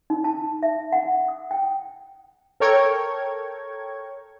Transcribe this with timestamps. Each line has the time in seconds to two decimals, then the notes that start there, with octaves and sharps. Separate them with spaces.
0.10 D#4
0.24 A5
0.63 E5
0.92 F#5
1.28 D#6
1.51 G5
2.60 A4 A#4 C#5 G5 C#6 G#6